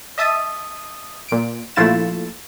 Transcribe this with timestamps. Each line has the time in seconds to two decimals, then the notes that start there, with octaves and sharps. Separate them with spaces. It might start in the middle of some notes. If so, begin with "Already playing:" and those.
0.18 D#5 E5 A5 D#6
1.28 A#2 D7
1.76 A#1 A3 E4 F4 A6 E7